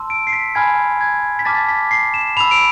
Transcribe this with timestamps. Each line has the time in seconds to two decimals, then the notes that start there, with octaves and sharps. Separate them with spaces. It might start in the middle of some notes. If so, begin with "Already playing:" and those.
Already playing: A5 C6 E6
0.10 D7
0.27 C7
0.33 B6
0.55 G#5 B5 F6 G#6
1.01 G#6
1.39 B6
1.45 A5 D6 F6 A6
1.69 B6
1.91 C7
2.14 E7
2.37 B5 E6 F7
2.51 D7